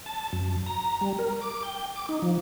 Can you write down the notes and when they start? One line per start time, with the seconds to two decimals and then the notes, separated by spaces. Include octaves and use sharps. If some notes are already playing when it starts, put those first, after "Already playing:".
0.06 A5
0.33 F#2
0.66 A#5
1.01 G3
1.19 A#4
1.42 D6
1.63 G5
1.96 D6
2.09 D#4
2.22 F3